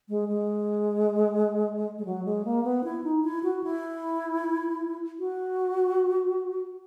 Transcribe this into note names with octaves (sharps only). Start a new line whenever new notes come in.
G#3
G#3
G#3
F#3
G#3
A#3
B3
E4
D#4
E4
F#4
E4
F#4